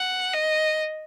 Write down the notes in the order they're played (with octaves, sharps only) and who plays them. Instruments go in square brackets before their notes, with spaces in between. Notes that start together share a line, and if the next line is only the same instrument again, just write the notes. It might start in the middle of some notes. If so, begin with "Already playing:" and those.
Already playing: [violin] F#5
D#5